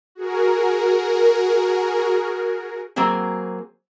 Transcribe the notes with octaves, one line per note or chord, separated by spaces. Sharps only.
F#4 G#4 A#4
F#3 A#3 C4 F#4 G#4